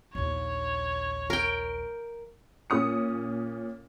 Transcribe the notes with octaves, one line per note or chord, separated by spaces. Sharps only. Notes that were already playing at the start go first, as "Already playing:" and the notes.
A#1 D#2 C#5
A#4 G5
A#2 C#4 D#6 C#7